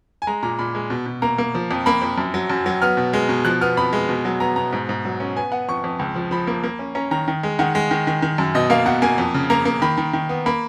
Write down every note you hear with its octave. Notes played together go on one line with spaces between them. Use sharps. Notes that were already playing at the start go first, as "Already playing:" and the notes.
G#5
G#3 A#5
A#2 A#5
A#2 B5
G#3
B2
B2
A#3 A#5
A#3
F3
F2
A#3 B5
F2
F#2
F#3
F#2
F#3
B3 F6
B2
G#3
B2
F3 F#6
B3 F6
F2 B5
G#3
B2
F#3
B3 A#5
B2 A#5
G#2
G#2
F#3
C#4
B3 G#5
B3 F#5
F2 C#6
F2
C#2
F3
F3 B5
A#3
A#3
C#4
C#4 A#5
D#3 A#5
D#3
G#3
D#3 F#5
G#3
D#3
D#3
D#3
F#2
B2 D#5
A#3 F5
B2 F#5
A#3 G#5
F2
C#3
A#3 A#5
A#3
D#3 B5
D#3
D#3
B3
A#3 B5